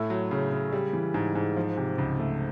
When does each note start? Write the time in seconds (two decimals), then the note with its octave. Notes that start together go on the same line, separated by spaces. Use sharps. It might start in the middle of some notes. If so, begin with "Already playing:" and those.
Already playing: A2 A3
0.10 F#3
0.31 C#3
0.52 C#3
0.72 G3
0.93 E3
1.14 G#2
1.35 G#2
1.56 F3
1.77 C3
1.98 C#2
2.19 A3